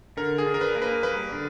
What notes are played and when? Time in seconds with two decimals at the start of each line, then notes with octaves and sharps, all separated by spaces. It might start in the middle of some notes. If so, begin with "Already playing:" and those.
0.17 D3 A#4
0.38 G#4
0.46 D4
0.54 A#4
0.61 B4
0.75 A#3
0.82 B4
1.03 G3 B4
1.32 D3